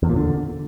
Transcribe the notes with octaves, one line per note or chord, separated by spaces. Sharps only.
E2
A#2
D3